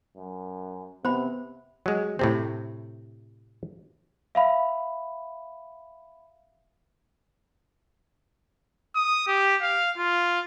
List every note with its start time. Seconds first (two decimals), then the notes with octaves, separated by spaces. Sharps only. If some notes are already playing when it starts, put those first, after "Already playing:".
0.17 F#2
1.05 C3 B3 C5 B5
1.86 F#3 G#3
2.19 A2 C3 C4
4.35 E5 F5 B5
8.95 D#6
9.27 G4
9.62 F5
9.98 F4